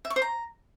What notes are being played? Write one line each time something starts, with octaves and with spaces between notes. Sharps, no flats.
E5
C#6
C5
A#5